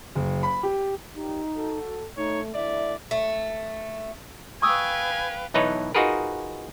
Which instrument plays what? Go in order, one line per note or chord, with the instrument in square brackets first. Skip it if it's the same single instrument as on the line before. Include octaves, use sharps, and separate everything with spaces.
[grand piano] F#1
B5
G4
[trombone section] D#2 A#2 G4 [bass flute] D#4
[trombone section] F#4 A4
[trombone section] A3 [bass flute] D#4 [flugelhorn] C#5
[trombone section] D3 A3 E4 [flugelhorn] D5 [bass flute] E5
[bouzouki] A3
[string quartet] B4 F5 G5 [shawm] G#5 [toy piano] C#6 D#6 E6
[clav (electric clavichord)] B1 E3 D#4 B4 C#5 A5
D#4 F4 F#4 G#4 A#4 B4